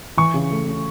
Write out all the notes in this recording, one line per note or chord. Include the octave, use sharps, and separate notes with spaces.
E3 C#6
C#3
A3
C#3